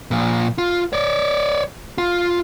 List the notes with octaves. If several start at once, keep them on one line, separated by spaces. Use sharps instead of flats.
A#2 F3
F4
C#5 D5
F4